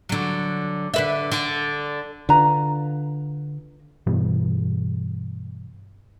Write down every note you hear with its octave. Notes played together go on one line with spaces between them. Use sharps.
D3 F#3
D3 B4 E5
D3
D3 F4 B4 A#5
G2 B2 E3 G3